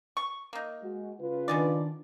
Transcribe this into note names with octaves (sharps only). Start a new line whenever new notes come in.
C#6
A#3 D#4
G#3 F#4
C#3 F4 B4
B2 D#3 D4 G#4 D5